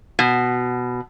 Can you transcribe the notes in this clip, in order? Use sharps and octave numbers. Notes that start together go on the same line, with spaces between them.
B2